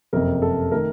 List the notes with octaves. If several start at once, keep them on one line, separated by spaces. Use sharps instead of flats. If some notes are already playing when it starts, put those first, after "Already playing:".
F#1 F2 C3 A#4
A4
D#3 A3 A#4